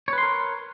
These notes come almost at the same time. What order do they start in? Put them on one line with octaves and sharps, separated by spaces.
C#5 B4 C6 A#4